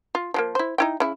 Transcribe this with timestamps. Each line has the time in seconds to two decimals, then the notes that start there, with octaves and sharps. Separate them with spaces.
0.15 F4
0.34 F3 G#3 A#3
0.55 E4 C5
0.78 D#4 E4 G5
1.00 C#3 E4